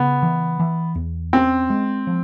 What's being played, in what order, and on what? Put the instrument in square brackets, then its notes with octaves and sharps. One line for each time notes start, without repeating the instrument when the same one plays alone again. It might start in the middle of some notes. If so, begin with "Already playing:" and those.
Already playing: [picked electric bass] C#3 [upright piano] B3
[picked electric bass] E3
E3
E2
[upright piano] C4 [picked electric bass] C#4
[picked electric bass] G#3
F3